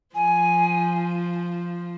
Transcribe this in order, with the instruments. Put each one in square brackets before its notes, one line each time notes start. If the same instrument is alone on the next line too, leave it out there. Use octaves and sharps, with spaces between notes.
[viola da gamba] F3 [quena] G#5